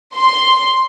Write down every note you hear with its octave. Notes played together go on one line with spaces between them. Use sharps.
C6